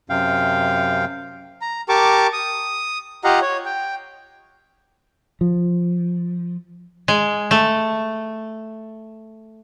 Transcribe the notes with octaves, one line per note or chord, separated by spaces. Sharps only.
F#2 C3 F5 G5
A#5
G4 A#4 A5 C#6 D6
D#6
F4 G4 D#5 F5 F#5 A#5
C#5
G5
F3
G#3
A3